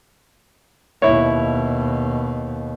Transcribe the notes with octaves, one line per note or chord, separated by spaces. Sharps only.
D#2 B2 E4 C#5